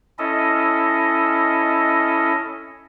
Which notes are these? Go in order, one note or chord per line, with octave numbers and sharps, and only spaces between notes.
C#4 E4 A4 D#5